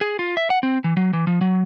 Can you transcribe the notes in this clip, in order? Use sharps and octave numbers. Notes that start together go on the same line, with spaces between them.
G#4
F4
E5
F#5
C4
E3
F#3
E3
F3
F#3